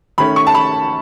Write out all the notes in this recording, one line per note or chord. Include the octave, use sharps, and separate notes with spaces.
D#3 A3 C#4 B5
C#6
A5
B5